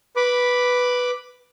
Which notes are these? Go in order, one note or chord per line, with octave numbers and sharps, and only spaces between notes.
B4 B5 D6